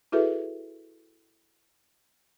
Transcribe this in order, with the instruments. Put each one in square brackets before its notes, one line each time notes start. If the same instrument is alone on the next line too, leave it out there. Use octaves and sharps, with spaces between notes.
[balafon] E4 F#4 G#4 A4 B4 E5